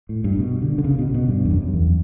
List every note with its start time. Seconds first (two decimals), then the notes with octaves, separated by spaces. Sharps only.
0.09 A2
0.24 G2
0.39 B2
0.62 D3
0.78 D3
0.84 C#3
0.99 B2
1.09 C#3
1.14 B2
1.28 G2
1.45 E2
1.51 F#2
1.73 E2